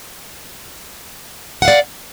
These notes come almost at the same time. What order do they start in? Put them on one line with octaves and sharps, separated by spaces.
F#5 F5 D5